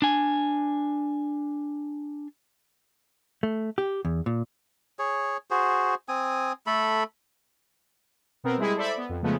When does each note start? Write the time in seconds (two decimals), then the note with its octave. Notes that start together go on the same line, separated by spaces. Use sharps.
0.02 D4 G#5
3.43 A3
3.78 G4
4.05 E2
4.26 A#2
4.99 G#4 C#5
5.51 F#4 G#4 C5
6.08 C4 G#5 D#6
6.67 A3 A4 B5
8.44 B2 B3 C4 A#4
8.58 G3 G#3 E4 G#4
8.76 A4 C5 D5 E5 B5
8.97 B3
9.09 F2
9.22 C#3 F3 G#3 A3 B3